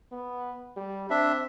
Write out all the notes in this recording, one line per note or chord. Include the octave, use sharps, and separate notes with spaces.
B3
G3
C4 D4 E5